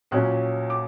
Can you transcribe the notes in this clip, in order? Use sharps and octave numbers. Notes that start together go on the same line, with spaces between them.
A#1 A#2 F#3 C#4 F#6
D6